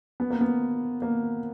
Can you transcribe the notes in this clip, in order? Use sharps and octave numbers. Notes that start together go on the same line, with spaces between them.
B3
A#3
B3
A#3